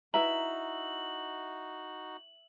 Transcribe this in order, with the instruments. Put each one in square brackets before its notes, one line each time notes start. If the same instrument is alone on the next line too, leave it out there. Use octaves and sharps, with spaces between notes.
[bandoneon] D#4 F#4 [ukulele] E4 B4 A#5 [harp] E5 [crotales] F#7